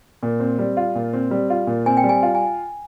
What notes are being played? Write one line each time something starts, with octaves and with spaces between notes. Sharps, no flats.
A#2
C4
G3
F4
A#2
C4
G3
F4
A#2
C4 G#5
G5
G3
G#5
F4
G#5